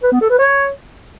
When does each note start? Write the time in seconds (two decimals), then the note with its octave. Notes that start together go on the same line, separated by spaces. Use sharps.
0.03 B4
0.12 B3
0.21 A4
0.30 B4
0.39 C#5